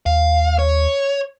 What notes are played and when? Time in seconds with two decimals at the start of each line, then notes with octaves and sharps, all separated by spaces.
0.06 D#2 F5
0.59 C#5